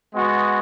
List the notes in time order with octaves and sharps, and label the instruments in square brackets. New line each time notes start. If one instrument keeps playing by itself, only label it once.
[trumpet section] G#3 B3 F#4